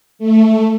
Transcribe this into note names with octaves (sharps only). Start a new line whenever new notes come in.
A3